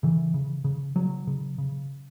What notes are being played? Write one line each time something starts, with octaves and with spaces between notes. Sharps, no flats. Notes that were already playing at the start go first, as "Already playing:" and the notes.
C#3 E3
C#3
C#3
C#3 F#3
C#3
C#3